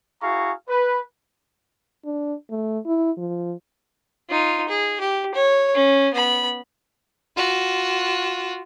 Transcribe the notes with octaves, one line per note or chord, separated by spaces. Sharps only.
E4 F#4 G#4 F5 A#5 C#6
B4
D4
A3
E4
F3
D#4 F4
G#4
G4
C#5
C#4
B3 B5
F4 F#4